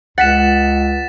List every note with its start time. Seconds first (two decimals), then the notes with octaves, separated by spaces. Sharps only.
0.18 C#2 F#5 A6 B6 E7